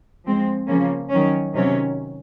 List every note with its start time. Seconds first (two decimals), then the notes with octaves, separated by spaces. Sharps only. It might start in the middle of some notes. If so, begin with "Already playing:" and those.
0.25 F3 G#3 C4
0.68 C#3 F3 A#3 C#4
1.11 D#3 F#3 C#4
1.54 C3 D#3 F#3 C#4